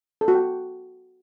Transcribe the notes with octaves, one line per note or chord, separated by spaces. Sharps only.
A4
F#4
G5